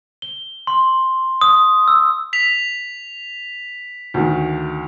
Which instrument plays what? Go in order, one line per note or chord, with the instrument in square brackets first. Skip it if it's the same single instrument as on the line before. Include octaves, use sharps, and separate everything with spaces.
[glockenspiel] G7
C6
D#6
E6
[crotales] B6 F7
[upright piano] D2 D#3